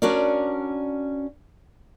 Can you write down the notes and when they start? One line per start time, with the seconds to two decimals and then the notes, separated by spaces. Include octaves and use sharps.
0.02 C#4 D4 F#4 A#4 D5